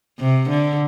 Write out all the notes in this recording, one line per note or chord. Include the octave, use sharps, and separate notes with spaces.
C3
D3